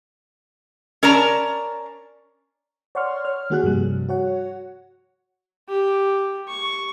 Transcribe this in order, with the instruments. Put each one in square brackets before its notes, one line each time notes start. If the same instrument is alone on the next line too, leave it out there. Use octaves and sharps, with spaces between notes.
[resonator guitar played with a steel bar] C#4 A#4 D5 A5 A#5
[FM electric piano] C#5 D5 F#5 C6 C#6 F6
C#5 F6
D#3 A#3 F#4 G#4 F#6
G2 C3 F3 G3
F#4 C#5 F#5
[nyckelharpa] G4
C#6